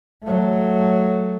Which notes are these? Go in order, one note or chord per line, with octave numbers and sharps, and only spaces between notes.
F#3 A3